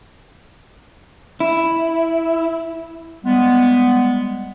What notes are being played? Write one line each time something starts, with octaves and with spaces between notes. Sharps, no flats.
E4
G3 G#3 B3